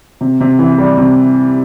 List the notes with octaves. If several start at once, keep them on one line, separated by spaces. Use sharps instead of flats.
C3
C3
E3
G3
C3